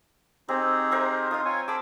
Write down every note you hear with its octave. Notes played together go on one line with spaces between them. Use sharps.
C4 D#4 G4 G#4
A#4 C5 E5
D#4 F4 D#5 D#6
F4 C#5 G#5
G#4 A5 B5 D6 E6